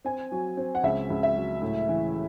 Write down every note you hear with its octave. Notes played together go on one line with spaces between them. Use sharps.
C4 G#5
F#3
C4
F#5
C#2 E5
C#2
E5
F#3
A2
E3